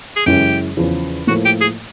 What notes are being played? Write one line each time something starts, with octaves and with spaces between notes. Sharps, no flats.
G#4
F#2 C#3 E3 G#3 G4
E2 C#3 F3
A2 F3 A#3 F#4
G4
G#4